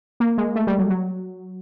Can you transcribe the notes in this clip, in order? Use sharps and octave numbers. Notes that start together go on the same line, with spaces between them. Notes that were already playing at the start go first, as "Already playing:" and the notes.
A#3
G#3
A3
G3
F#3
F#3